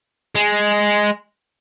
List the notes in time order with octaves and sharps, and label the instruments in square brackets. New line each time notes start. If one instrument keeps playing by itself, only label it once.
[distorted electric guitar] G#3